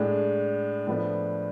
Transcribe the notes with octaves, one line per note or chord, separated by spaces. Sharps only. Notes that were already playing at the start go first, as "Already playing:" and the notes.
Already playing: A2 G#3 D4
A2 F3 B3 D4